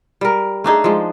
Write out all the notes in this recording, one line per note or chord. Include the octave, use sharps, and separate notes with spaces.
G3 A#4
A3 D4 D#4 G#4
F3 G#3